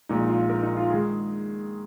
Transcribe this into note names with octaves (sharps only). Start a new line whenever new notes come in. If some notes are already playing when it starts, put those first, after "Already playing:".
A#1 A#2 G#3 D#4
F4
A#4
D#4
F4
D#3 G#3 G#4